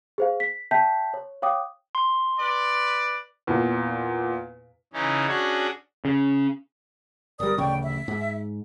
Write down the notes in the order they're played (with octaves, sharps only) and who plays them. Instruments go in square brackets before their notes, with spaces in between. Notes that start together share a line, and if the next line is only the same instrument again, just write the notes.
[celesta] G#4 C5 F5
B6
E5 G5 A5 G6 B6
C#5
C#5 F5 G5 D6 D#6
[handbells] C6
[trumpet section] B4 D5
[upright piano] E2 A#2
[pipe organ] C#3 E3 C#4 D#4
C#4 D4 F#4 G#4 C#5
[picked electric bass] C#3
[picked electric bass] G1 G3 [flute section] A#4 D5 D#6
[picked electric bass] D1 A1 C#3 [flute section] D5 G5 C#6
[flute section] E5
[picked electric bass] G#2